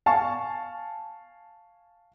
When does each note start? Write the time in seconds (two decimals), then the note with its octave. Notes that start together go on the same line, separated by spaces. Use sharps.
0.06 F5 G#5 A5 C#6